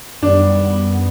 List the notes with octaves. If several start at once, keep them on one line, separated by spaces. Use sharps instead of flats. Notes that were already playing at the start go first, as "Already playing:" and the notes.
F#2 D#3 G3 B3 D4